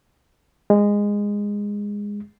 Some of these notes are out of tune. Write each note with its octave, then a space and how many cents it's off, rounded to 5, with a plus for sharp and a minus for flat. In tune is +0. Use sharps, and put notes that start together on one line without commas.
G#3 -15